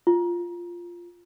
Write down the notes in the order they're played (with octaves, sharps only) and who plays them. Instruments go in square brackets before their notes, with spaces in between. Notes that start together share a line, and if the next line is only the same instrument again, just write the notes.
[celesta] F4